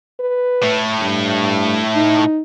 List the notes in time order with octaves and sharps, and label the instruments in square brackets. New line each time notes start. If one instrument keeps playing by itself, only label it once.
[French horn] B4
[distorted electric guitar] A2 A3
[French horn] G2
D#4